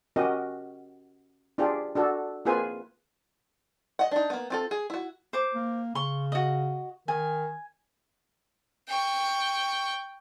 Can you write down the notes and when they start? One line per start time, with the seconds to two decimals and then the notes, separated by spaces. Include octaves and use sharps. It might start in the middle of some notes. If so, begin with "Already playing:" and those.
0.16 C#4 F#4 G4 A#4 D#5
1.58 D4 F4 G4 G#4
1.95 D4 F#4 A4
2.45 A#3 C4 F4 G#4 B4 G#5
3.99 D#5 F#5
4.11 D4 D#4
4.30 A#3 B3
4.50 C4 F4 A4
4.71 G#4
4.90 E4 F#4
5.33 C5 D6
5.55 A#3
5.95 C#3 C6 C#6
6.32 F#4 D#5
7.08 D#3 G#5
8.88 G5 C#6